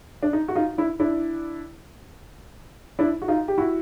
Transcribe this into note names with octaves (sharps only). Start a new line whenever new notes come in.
D4
D#4
F#4
D#4 F4
D4 E4
D4 E4
D4 E4
F#4
D#4 F4
G4
E4 F#4